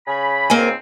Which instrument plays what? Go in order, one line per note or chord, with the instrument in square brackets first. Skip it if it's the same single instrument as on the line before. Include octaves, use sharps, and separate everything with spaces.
[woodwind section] C#3 G#5 B5
[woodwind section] C#2 G#2 C4 [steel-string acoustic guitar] A#3 A#4 G#5